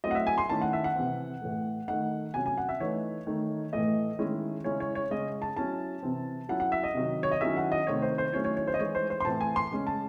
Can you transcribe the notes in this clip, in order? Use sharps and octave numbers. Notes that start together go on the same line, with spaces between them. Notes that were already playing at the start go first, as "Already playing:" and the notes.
F#3 A3 C4 E4 D#5
F#5
E5
G#5
C6
D#3 A3 C#4 E4 A5
F#5
E5
F#5
C3 E3 C4
A2 E3 A3
D#3 A3 D#4 F#5
C3 F#3 C#4 G#5
G#5
F#5
E5
E3 A3 D#4 C#5
D#3 A3 D#4
A2 E3 A3 D#5
D#3 G#3 C#4 E4 C#5
C#3 G#3 C#4 E4 C#5
C#5
C#5
C#3 G#3 C#4 D#5
A5
F#3 C#4 E4 A5
C3 E3 C4
F#3 C#4 E4 F#5
F#5
E5
D#5
C3 D#3 F#3
C#5
D#5
D#3 F#3 C#4 E4 E5
F#5
D#5
C3 D#3 A3 C4 C#5
C5
C5
D#3 F#3 A3 C#4 E4 C#5
C#5
C#5
C5
D#5
E3 G#3 D#4 C#5
C5
C5
C6
A2 E3 C4 E4 A5
G#5
C6
C#3 G#3 C#4
A5